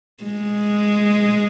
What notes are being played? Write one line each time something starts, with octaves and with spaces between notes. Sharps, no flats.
G#3